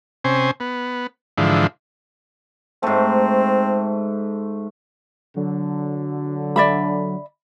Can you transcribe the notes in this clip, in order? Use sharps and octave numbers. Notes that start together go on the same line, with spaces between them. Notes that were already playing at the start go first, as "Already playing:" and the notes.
C3 C#4 C5 G#5
B3
G#2 D3 E3 F3
G#2 A3 C4
D3 F#3
D5 E5 B5